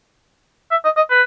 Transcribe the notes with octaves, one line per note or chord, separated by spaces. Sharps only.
E5
D#5
D#5
B4